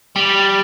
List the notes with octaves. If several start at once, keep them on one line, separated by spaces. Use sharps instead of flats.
G3